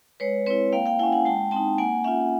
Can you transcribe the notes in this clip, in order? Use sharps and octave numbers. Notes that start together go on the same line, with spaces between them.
G#3 B4 C#5
C4 E4 B4 C#5
A#3 F5 G5
F5 G5
C#4 E4 F#5 G#5
F#5 G#5
G#3 G5 A5
C4 G5 A5
D#4
A#3 F#5 G#5
C#4 F4 E5 F#5